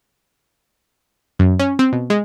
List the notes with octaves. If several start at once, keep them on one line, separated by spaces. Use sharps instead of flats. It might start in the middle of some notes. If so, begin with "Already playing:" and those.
F#2
C#4
C4
B2
G#3